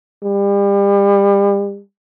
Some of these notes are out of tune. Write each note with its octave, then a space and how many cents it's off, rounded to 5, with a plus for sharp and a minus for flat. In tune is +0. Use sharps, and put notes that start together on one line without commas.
G3 +35